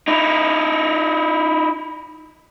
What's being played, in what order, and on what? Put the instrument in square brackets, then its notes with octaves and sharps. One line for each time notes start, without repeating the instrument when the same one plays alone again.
[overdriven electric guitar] D#4 E4